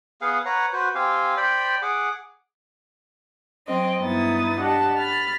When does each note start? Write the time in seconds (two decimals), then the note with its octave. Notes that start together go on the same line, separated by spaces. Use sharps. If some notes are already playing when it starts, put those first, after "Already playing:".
0.21 B3 G#4 F5 F#5
0.46 B4 C#5 F#5 A#5
0.73 F#4 B4 C5
0.95 C4 G4 F5 G#5
1.37 C5 D5 G5 B5
1.82 G#4 F#5 D6
3.68 F#3 C4 D#5
4.00 G2 B3 D#4 E4 D#6 A6
4.59 D4 G4 D#5 F#5 A5
4.96 B5 F6 A6